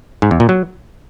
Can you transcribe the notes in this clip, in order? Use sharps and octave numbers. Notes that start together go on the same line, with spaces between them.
G#2
E2
A#2
F#3